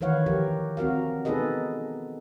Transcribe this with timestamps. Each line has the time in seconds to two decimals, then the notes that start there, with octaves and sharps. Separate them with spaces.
0.01 D#3 E3 B4 C#5 F5 F#5
0.26 F3 G4 A#4
0.77 C4 F#4 A#4 F5
1.25 B3 D#4 G#4 A4 B4 D#5